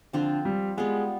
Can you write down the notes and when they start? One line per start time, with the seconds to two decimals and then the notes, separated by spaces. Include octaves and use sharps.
0.13 D3 F3 C4 F4
0.45 G3
0.77 G3 G#3 B3 F4